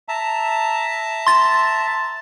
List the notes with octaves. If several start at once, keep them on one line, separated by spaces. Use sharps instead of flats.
E5 A5 A#5
C6 A6